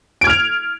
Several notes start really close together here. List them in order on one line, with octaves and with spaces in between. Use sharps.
D7 G#6 F6 F7